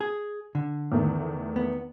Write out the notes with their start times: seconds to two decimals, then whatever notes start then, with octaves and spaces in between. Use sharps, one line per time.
0.01 G#4
0.55 D3
0.92 E2 D#3 A3
1.56 B3